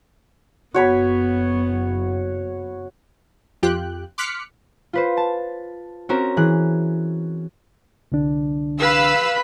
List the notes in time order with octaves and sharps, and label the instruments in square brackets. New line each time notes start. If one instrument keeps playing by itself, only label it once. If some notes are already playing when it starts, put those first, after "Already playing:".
[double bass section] F#1 [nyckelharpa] B3 [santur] F#4 C#5 B5
[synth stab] F2 F4 G4 G5 F#6
C6 D6 F6 F#6 B6 C#7
[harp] F4 B4 C5
A5
C4 C#4 F#4 A#4 A#5
E3 G#4 F#6
[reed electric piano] C2 D3 D4
[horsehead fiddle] B4 B5 [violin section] F5 E6